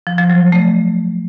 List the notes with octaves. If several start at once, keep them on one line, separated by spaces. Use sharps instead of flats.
F3
F3
F#3
F#3
A3